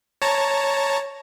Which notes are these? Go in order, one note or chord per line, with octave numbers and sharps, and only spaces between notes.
C#5 A5 A#5